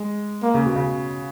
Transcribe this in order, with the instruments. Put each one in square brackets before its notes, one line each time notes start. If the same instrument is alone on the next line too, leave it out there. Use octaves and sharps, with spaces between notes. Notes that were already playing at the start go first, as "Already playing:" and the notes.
Already playing: [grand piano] G#3
[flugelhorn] A#3
[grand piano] C#3
B2
C#3